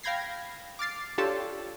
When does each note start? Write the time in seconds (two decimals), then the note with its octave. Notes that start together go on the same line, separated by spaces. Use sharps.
0.03 F5 G5 B5 G#6 A#6 C7
0.79 D6 F6 A6 C7
1.18 D4 F4 G4 A4 C#5 A5